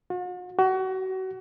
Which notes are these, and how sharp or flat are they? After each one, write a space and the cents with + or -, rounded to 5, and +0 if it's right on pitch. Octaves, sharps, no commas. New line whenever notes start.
F#4 -45
F#4 +30